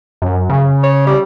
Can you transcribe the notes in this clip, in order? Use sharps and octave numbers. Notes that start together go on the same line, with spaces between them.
F#2
C#3
C#5
G3